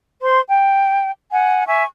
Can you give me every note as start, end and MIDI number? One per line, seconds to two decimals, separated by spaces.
0.22 0.40 72
0.22 0.40 84
0.48 1.09 79
1.30 1.68 78
1.30 1.68 80
1.68 1.85 76
1.68 1.85 80
1.68 1.85 85